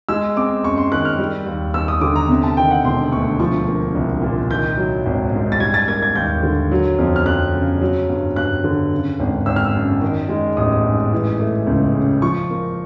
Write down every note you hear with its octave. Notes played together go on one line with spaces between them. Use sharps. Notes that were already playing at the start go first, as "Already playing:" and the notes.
G#3 E6
C4 D6
F#2 C#6
C6
D#3 F#6
F6
G3
D#2
D#2 E6
D#6
D3 D6
A#5
C3
A5
D#3 G5
F#5
E1 C6
D2 C#6
F3 C#6
A#3
C2
A#2
D#3 G6
F#3
G#1
G#2
A6
G3 G#6
A6
A#3 G#6
G#6
D#2 G6
D3
F#3
F2
F6
F2 F#6
C#3
F#3
G2
G2 F#6
D3
C#3
G#1
G#1 E6
F6
E6
F#2
D#3
G#3
A1 D#6
G#2
E3
A3
C#2
C#3
F3 C#6
A#3